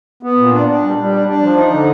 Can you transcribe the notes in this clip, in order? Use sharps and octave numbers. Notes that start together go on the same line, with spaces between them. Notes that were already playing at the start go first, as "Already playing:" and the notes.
B3
A#2
D4
D4
G3
G3
D4
D4
F3
D#4
D3